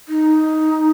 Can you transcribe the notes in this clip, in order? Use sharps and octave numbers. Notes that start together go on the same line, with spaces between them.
D#4